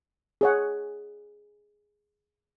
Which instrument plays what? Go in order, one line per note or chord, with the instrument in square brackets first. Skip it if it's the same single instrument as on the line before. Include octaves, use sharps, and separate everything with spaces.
[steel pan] G#4 C#5 F#5